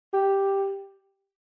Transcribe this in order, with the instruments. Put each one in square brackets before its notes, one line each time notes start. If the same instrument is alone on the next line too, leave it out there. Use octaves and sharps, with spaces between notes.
[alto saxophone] G4